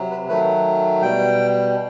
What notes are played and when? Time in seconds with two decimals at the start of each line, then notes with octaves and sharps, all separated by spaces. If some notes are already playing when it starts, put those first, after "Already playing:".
Already playing: C3 F#3
0.11 B4
0.28 D#3 F#3 A3 B4
1.02 B2 G3 G5